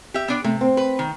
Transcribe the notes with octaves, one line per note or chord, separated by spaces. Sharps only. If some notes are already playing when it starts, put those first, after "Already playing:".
G4 E5
B3 D4 D5
C3 A3
C4
B4
D#3